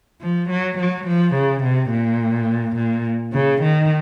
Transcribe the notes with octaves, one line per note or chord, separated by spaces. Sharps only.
F3
F#3
F#3
F3
C#3
C3
A#2
A#2
C#3
D#3